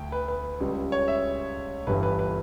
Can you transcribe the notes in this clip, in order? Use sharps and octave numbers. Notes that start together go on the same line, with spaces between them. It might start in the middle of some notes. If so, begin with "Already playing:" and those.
Already playing: D2 A3 G5
B4
B4
C#2 C#3 G3
C#5
E5
G1 G2 E3 G3 B4
B4
B4